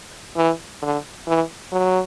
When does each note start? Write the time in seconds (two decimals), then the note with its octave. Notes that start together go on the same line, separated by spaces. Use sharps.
0.36 E3
0.82 D3
1.27 E3
1.72 F#3